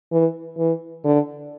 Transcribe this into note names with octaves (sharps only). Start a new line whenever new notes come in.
E3
E3
D3